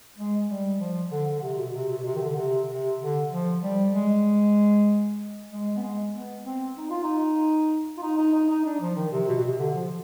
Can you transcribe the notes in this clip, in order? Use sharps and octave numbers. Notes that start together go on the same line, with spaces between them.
G#3
G3
F3
D3
D3
C3
B2
C3
B2
C3
D#3
D3
C3
C3
D3
F3
G3
G#3
G#3
B3
G#3
B3
C4
D#4
F4
D#4
F4
D#4
D#4
D#4
D#4
D4
F3
D#3
C3
B2
B2
C3
D3
F3